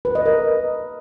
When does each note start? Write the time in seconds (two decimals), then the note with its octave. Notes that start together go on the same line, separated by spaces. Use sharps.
0.05 B4
0.15 D#5
0.26 A#4